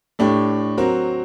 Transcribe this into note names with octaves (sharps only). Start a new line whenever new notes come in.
A2 A3 D4 G4
F#3 C4 F#4 A#4